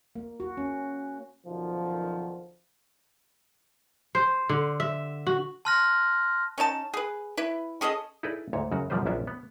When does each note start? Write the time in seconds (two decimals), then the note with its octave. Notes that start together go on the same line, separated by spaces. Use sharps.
0.16 A#3
0.40 F#4
0.57 C#4
1.46 B1 F#2 D3 D#3 F3
4.15 C5
4.49 D3
4.80 E5
5.27 F#4
5.65 A5 C6 F6 F#6 A#6
6.58 C#4 D#4 D5 A5
6.94 G#4 B4
7.37 E4 B4
7.81 C#4 G#4 A4 D#5
8.23 D#4 E4 G#4 A4 B4 D5
8.53 D2 G#2 C#5
8.72 F#2 C#3 F#4
8.90 F#2 B2 F3 G3 B4 C5
9.06 A#1 F#2 B3 C#4 D4 E5
9.27 B3